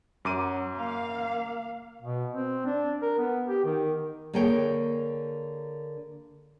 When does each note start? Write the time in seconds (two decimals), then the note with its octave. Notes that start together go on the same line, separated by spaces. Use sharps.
0.25 F#2 F#3 D6 D#7
0.77 A#3 F5
2.02 B2
2.33 C4
2.66 D4
3.02 A#4
3.18 B3
3.47 G4
3.65 D#3
4.33 D3 A#3 G#4 A#4 C#5 G5